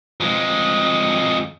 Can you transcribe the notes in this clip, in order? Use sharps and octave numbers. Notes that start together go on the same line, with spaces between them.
F2 G#3